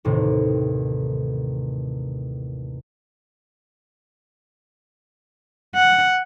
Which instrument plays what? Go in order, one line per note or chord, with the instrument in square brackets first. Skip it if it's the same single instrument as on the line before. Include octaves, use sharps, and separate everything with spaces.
[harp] A1 D#2 A2 C3 D#3
[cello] F#5